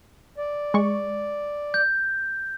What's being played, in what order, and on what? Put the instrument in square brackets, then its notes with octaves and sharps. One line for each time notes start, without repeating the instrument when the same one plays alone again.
[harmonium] D5
[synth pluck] G#3 C#6
[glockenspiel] G6